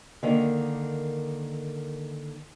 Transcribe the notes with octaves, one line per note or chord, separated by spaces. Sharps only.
D3 D#3 A#3